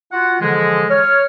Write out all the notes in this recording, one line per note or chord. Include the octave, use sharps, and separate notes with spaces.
F4 F#4 F#5
D3 E3 F3 G#3
C#5 F6